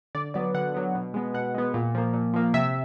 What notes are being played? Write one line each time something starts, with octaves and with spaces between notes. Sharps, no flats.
D3 D5
F#3 B3 D5
D3 F#5
F#3 B3
B2
G#3 B3
B2 F#5
G#3 B3
A#2
F3 A#3
A#2
F3 A#3
C3 E5